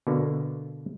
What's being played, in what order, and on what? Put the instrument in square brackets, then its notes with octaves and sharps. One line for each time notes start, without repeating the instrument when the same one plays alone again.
[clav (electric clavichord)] B2 D3 A#3